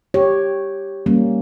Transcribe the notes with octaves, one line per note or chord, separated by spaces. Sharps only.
G4 C#5
G3 A#3 C#4